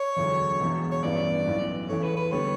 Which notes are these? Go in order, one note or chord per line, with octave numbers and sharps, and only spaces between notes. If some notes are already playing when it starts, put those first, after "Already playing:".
Already playing: C#5
E1 D2 D3 F#3
E1 E2 B2
C#5
A1 G2 E3 B3 D5
B1 A2 E3 B3
E2 C#3 E3 A3 C#5
B4
B4
D3 G3 B3 C#5